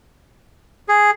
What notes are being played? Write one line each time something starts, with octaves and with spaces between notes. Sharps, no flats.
G#4